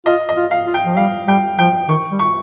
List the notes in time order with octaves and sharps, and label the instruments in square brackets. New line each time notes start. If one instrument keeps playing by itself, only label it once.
[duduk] F4 [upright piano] D#5
[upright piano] D#5
[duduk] F4
[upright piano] F5
[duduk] F4
[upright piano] G5
[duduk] F3
[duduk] G3 [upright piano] F5
[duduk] G3 [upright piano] G5
[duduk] F3 [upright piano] G5
[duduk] D#3 [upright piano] C#6
[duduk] G3
[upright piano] C#6